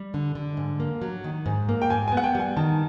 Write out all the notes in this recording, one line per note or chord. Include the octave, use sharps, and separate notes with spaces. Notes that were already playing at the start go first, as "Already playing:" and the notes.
Already playing: G3
D3
D3
G#2
A#3
F#3
D#3
G#2
A#3
G5
G#2 G#5
B3 G#5
F#5
G5
G3 G#5
D#3 A5